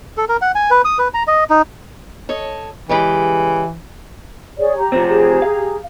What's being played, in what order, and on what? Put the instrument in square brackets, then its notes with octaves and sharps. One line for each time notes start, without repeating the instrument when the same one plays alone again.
[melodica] A4
A#4
F#5
G#5
B4
D#6
B4
A#5
D#5
D#4
[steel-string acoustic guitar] A4 C#5 D#5
[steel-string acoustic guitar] C#3 G#3 G4 [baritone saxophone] E3
[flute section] G#4 C#5 D5
G4 A#5
[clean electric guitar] C3 F3 C4
[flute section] G4 G#4 A#5
[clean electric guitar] F5